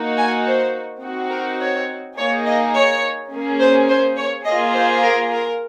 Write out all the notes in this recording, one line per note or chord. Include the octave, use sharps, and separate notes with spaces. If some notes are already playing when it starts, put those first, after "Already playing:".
Already playing: A#3 D#4 F#4
G#5
C5
C4 D#4 F#4
A#4
C#5
A#3 D#4 G#4 C#5
D#5
C#5
A#3 C#4 G#4
C5
C5
C#5
A#3 F4 G#4 D#5
C5
A#4
A#4